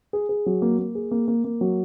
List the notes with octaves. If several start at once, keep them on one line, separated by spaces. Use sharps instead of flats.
G#4
G#4
F#3
A#3
A#3
G#4
A#3
A#3
A#3
F#3